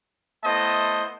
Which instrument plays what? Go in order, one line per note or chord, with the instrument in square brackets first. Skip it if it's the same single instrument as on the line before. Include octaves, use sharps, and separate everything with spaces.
[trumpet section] A3 B3 E4 C5 D#5 A5